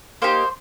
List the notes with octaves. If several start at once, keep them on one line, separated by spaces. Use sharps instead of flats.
A#3 D#4 G4 C5 C6